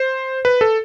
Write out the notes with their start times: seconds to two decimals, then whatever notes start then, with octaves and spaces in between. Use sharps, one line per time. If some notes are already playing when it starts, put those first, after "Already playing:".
Already playing: C5
0.45 B4
0.61 A4